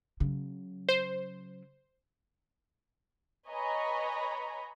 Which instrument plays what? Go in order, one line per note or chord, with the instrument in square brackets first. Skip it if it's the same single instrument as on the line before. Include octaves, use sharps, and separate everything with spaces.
[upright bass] C#3 F#3
[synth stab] C5
[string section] B4 C#5 D#5 G#5 A#5 B5